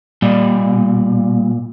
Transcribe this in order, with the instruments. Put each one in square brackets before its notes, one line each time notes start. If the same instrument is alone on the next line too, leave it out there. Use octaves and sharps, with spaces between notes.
[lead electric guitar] A#2 [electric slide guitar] G3 D5 D#5